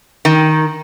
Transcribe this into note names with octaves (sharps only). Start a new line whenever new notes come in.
D#3